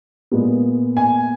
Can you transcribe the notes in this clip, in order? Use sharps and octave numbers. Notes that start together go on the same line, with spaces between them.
A#2 G#3 B3
G#5